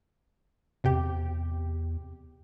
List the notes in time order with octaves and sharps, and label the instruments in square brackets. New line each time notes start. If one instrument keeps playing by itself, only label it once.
[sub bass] E2 [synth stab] C3 G4